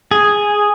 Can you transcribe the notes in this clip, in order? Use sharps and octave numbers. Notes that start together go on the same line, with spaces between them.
G#4